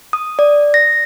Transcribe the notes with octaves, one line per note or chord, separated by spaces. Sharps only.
D#6
D5
A#6